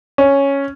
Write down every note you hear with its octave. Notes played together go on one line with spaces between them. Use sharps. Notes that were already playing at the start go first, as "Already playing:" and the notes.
C#4